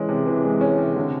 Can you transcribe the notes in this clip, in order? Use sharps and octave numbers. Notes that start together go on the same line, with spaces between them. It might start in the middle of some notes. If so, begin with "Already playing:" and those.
Already playing: E3 G#3 C#4
C3
E3
G#3
C#4
C3
D3